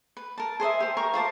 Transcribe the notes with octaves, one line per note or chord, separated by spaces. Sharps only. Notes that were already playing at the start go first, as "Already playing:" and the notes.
B4
A#4 A5
G#4 C5 D#5 E5
G4 C5
A#4 A#5 C#6
F4 C5 A5 D6